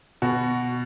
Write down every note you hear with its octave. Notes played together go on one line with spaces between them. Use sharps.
B2 F#4